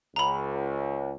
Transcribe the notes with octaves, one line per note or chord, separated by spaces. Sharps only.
C#2 A#5 B5